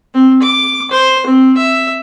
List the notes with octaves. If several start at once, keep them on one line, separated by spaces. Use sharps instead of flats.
C4
D6
C5
C4
E5